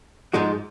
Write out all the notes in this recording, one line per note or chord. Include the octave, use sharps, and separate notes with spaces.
G#2 F3 G#3 D#4 F#4